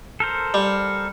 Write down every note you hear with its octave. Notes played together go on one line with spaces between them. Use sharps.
A4 A#4 C5
G3